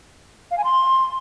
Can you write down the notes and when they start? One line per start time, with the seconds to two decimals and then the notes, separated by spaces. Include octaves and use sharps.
0.51 F5
0.58 G#5
0.64 C6